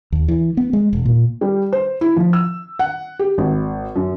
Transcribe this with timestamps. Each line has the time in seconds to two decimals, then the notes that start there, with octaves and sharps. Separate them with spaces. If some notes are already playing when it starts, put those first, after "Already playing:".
0.12 D#2
0.28 E3
0.57 B3
0.73 G#3
0.93 E1
1.05 A#2
1.41 G3
1.73 C5
2.01 E4
2.16 F3
2.33 E6
2.79 F#5
3.19 G4
3.38 G#1
3.96 F#2